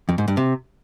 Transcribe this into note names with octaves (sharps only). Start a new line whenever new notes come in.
F2
G#2
G2
C3